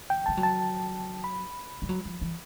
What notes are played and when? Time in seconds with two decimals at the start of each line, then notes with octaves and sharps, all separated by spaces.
0.10 G5
0.26 G3 A5
0.37 F#3
0.43 A5
1.24 B5
1.82 G3
1.89 F#3
2.05 F3
2.21 E3